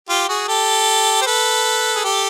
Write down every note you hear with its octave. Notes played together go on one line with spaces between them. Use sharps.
F4 G4
F#4 G#4
G4 A4
C5
A4 B4
G#4
G4 A4